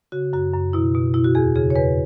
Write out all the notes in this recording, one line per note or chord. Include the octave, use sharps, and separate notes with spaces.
C#3 F#4
F#2 F#4
F#2
B2 E4
B2
B2 E4
F#4
E2 G#4
C#3 G#4
C#5
E2 B4